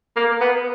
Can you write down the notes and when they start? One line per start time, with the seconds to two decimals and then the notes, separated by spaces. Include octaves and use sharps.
0.16 A#3
0.41 B3